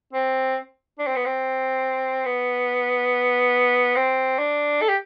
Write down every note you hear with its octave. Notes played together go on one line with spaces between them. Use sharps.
C4
D4
C4
B3
C4
B3
C4
D4
A4
G4